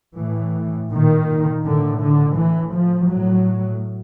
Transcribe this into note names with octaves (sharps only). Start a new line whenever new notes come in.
A2 E3
A#2 D#3
A2 D3
D3
A2 E3
F3
A2 F#3